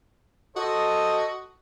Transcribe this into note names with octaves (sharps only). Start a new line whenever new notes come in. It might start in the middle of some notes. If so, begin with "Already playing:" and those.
F#4 A4 C5 D#5